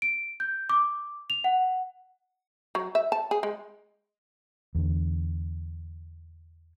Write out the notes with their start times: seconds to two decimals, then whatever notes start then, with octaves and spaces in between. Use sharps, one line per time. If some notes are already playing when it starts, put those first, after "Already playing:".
0.02 D7
0.40 G6
0.69 D6
1.30 F7
1.44 F#5
2.75 F#3
2.95 E5
3.12 A5
3.31 G#4
3.43 G#3
4.75 E2 D3